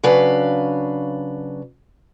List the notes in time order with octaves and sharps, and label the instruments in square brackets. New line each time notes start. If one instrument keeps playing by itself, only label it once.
[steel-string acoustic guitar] C#3 F#3 D4 B4 F5